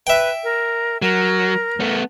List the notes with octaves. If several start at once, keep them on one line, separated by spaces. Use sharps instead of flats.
B4 E5 G5
A#4
F#3 A#4
A3 B3